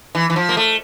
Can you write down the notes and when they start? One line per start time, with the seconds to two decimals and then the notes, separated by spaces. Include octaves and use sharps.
0.15 E3
0.30 E3
0.36 F3
0.49 A#3
0.57 A3